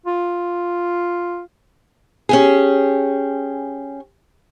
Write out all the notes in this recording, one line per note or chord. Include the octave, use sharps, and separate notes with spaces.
F4
C#4 G4 G#4